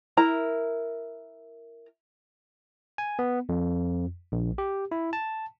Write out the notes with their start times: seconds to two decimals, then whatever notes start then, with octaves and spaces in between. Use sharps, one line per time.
0.17 E4 A#4 A#5
2.98 G#5
3.19 B3
3.49 F2
4.32 A#1
4.58 G4
4.91 E4
5.13 A5